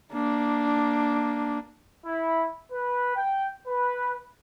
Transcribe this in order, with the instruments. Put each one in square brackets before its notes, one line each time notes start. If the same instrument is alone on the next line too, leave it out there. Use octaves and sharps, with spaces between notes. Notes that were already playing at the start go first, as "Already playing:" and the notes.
[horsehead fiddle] A#3 D4
[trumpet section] E4
B4
G5
B4